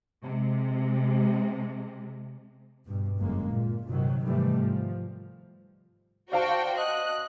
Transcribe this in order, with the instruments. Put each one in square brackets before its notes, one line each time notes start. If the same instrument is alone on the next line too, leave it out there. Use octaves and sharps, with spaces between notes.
[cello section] C3 G#3
[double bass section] G2 B2
G1 F#2 G#3 A#3
A#2
G2 C3 D#3 F#3
G#2 C3 D#3 E3 G3 A3
F3
[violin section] F#4 C5 G5 [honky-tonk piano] D5 F5 A5
[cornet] D#5 [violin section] F#6